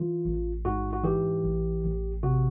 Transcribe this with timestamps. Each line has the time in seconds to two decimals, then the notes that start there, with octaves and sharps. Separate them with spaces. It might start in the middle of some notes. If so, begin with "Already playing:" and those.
Already playing: E3 F4
0.25 A1
0.65 G#2 F#4
0.93 F#4
1.04 E3 G4
1.44 A1
1.83 A1
2.23 C3 F#4